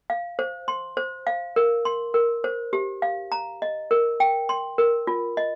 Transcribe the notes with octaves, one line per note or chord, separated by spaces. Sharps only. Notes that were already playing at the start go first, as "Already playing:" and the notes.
F5
C5
C6
C5
F5
A#4
C6
A#4
C5
G4
F5
A#5
D#5
A#4
G5
C6
A#4
F4
D#5